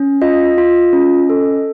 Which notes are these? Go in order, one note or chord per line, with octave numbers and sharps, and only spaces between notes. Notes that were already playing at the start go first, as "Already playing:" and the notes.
Already playing: C#4
F4 D#5
F4
C#4
A4